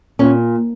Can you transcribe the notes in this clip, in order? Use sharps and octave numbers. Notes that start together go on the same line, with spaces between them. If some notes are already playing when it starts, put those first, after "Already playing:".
A#2 C#4